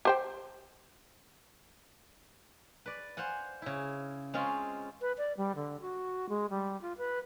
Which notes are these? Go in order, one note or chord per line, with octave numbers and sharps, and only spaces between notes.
G4 C5 G5
B4 D5
C5 F5 F#5 G#5
C#3 E4
G#3 C4 C#4 F4 F5
B4
D5
G3
D3
F#4
G#3
G3
F4
B4